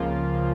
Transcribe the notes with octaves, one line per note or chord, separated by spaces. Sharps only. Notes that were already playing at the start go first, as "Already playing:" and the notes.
Already playing: C#2 C#3 F3 A#3 F4